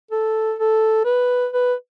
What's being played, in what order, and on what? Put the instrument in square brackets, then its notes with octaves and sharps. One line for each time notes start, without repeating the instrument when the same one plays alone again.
[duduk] A4
A4
B4
B4